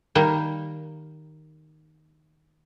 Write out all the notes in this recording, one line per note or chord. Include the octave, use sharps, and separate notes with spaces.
D#3 G3 A#3